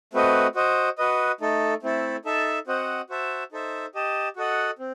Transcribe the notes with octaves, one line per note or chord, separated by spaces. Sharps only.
A3 C4 F#4 B4 D#5
F#4 C5 D#5
F#4 B4 D#5
A3 D#4 A4
A3 C4 E4 A4
D#4 A4 E5 A5
C4 F#4 C5 D#5 F#5
F#4 C5 E5 A5
D#4 A4 C5 E5
G4 D#5 A5
F#4 A4 D#5 F#5
C4